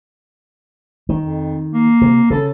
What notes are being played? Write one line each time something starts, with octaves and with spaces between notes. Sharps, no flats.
D#3
F2
A#3
C3
C#3 A4